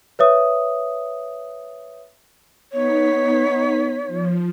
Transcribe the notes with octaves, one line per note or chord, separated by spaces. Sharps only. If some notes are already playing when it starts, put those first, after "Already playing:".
B4 C#5 E5 D#6
B3 D#4 C#5 B6
F3